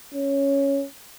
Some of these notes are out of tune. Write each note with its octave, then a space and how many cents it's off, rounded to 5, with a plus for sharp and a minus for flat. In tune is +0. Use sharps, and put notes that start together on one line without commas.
C#4 +0